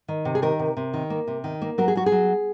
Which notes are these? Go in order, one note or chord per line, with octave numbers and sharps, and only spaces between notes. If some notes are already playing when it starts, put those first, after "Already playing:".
D#3
C3
G#4
D#3 A#4
C3
C3
D#3
A#3
C3
D#3
A#3
F#3 A#4
G#4
F#3 F#4
G#4
F#3